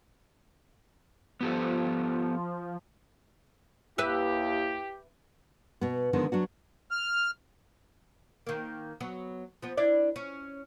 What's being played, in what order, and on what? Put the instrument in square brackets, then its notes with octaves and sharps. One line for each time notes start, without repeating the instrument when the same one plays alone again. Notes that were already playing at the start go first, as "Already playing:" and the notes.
[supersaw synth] F3 [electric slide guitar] B3 G4 A4
[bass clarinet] D#2 [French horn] E4 [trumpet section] G4 [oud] B4 E5
[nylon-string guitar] B2 B3
D3 D#3 F3 G#3 B3
F#3 D4 F#4
[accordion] F6
[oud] D#3 A#3
F#3 B3
F3 B3
D4 E4 D5
C#4